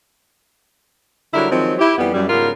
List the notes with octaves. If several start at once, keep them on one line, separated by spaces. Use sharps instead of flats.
D3 F#3 G3 E4 A#4
D#3 F3 F#3 G#3 C4
E4 G4
F2 E3 G3 B3
F#2 G3
G#2 C#3 B3 F4 G4 A#4